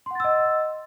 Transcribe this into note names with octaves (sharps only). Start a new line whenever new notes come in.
D#5 F#5 C6 E6 A6